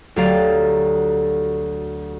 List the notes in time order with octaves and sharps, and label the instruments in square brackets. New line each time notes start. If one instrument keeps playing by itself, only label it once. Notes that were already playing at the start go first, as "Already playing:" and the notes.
[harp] D2 F#3 G4 F5 A#5 A6